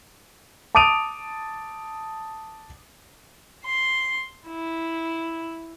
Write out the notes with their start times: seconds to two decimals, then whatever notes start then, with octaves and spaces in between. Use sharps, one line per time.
0.75 A5 D6 D#6 D7 D#7 F7
3.65 C6
4.47 E4